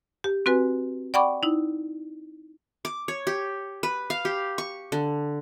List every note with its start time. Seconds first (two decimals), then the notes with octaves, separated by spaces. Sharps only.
0.24 G4
0.46 C4 F#4 B4 G#5
1.14 D5 F#5 G5 B5 C#6 D6
1.43 D#4 E4
2.85 D6
3.08 C#5
3.27 G4
3.83 B4
4.10 F5
4.25 G4
4.58 C#6
4.92 D3